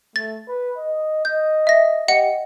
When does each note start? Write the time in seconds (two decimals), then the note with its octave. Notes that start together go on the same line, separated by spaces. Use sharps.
0.16 A3 A6
0.48 B4
0.77 D#5
1.25 D#5 G6
1.67 E5 A#6
2.08 G4 D#5 F#5 C#7